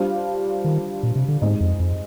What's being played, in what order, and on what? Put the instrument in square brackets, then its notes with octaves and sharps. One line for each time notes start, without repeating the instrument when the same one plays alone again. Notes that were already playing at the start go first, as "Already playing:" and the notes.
Already playing: [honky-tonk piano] G3 D4 F4 C5 F5
[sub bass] D#3
A#2
C3
D3
[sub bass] G#2 [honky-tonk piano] G#3 C4 D#4
[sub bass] F2
F2